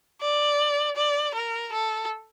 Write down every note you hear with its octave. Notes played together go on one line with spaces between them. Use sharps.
D5
D5
A#4
A4